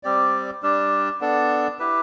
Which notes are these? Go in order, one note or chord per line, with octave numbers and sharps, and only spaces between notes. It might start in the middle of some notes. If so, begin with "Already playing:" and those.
G3 C4 G4 D5
G3 D4 G4 D5
B3 D4 A4 D5
E4 G4 B4